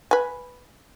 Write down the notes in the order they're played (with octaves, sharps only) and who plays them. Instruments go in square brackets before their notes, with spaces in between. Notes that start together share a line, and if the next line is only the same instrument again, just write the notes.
[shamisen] B4 G#5